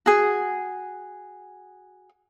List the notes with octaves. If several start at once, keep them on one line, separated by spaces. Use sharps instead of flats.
F#4 G#4